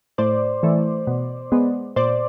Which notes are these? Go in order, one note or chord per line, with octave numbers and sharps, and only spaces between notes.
A2 C5 D5
E3 A3
B2
G#3 B3
A#2 C5 D5